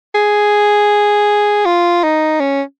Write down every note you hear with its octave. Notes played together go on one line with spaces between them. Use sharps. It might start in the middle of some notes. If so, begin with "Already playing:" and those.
G#4
F4
D#4
C#4